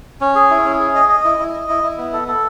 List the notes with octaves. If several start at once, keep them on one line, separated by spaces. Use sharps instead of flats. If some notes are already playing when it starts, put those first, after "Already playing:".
C#4
G#4
E4
C#4
G#4
D#5
D#5
E4
E4
D#5
E4
E4
B3
A4
A4